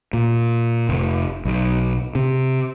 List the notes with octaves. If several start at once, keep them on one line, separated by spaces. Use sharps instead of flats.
A#2
F1
B1
C3